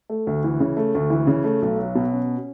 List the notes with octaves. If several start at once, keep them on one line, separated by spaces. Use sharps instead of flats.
A3
D2
E3
C#3
A3
D2
E3
C#3
A3
B1
F#3
B2
C#4